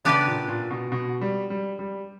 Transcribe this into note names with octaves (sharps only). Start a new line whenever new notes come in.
C#3 B3 D4 G4 B4 D5
A#2
A#2
B2
B2
G3
G3
G3